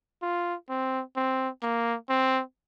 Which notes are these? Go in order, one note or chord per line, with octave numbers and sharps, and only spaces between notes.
F4
C4
C4
A#3
C4